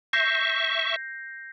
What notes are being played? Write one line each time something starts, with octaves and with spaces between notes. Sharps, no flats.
E5 C#6 G6 A#6 C7